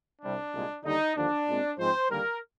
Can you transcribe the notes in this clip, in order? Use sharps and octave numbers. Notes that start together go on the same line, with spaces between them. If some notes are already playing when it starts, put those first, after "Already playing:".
C2 C3 G3 D4
C2 A#2 G#3
D#2 D3 G3 D#4
D#2 D3 F3 D4
A#2 G#3 C4
G#2 F3 G#3 C4 C5
D#2 D3 G3 A#3 A#4